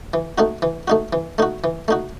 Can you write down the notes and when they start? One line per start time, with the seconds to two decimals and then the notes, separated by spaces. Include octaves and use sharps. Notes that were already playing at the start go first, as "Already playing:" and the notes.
0.14 E3
0.38 A3 D#4 F#4
0.62 E3
0.88 A3 D#4 F#4
1.13 E3
1.38 A3 D#4 F#4
1.64 E3
1.88 A3 D#4 F#4